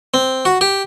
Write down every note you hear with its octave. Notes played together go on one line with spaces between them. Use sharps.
C4
F#4
G4